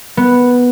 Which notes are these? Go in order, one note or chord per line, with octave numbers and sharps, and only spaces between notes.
B3